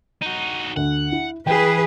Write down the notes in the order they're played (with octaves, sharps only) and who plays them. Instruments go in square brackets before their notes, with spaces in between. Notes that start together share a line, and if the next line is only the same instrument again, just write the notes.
[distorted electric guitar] D#4 F#4
[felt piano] D2 [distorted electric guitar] F#5
[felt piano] E4
[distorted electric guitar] E3 [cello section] G#4 B4 [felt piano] G5